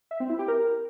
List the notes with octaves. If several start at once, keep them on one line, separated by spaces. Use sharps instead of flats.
E5
C4
E4
G4
A#4